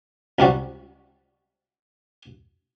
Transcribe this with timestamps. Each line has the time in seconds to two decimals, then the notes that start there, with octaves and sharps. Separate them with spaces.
0.39 C#2 C3 G3 F#4